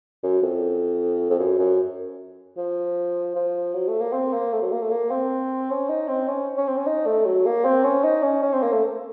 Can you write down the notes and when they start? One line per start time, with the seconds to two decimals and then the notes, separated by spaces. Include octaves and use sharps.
0.23 F#2
0.42 F2
1.30 F2
1.39 F#2
1.59 F#2
2.57 F3
3.36 F3
3.74 F#3
3.88 A3
4.01 A#3
4.13 C4
4.33 A#3
4.53 A3
4.62 F#3
4.72 A#3
4.82 A3
4.91 A#3
5.11 C4
5.70 C#4
5.89 D#4
6.08 C4
6.28 C#4
6.57 C#4
6.68 C4
6.77 C#4
6.87 D#4
7.06 A3
7.26 F#3
7.46 A#3
7.65 C4
7.84 C#4
8.04 D#4
8.23 C#4
8.43 C#4
8.53 C4
8.63 A#3
8.72 A3